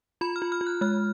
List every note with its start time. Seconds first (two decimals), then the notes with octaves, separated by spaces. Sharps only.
0.21 F4 B5
0.36 F6
0.42 F4
0.52 F6
0.61 F4
0.67 F#6
0.81 G#3 F6